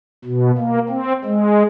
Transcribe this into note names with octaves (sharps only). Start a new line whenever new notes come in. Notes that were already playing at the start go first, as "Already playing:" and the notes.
B2
A#3
C4
G#3